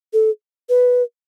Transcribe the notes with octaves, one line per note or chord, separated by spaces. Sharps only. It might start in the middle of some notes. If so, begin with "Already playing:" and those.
A4
B4